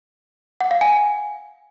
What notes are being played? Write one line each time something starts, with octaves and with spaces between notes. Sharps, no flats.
F#5
F5
G#5